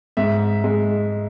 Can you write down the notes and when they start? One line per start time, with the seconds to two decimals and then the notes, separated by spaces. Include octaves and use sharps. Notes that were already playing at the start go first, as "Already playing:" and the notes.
0.17 G#2 E5
0.64 G#3